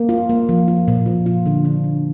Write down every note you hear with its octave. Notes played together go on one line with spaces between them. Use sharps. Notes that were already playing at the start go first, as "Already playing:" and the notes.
Already playing: A#3
F4
A#3
F3
F4
A#2
F3
F4
D3
D4
D3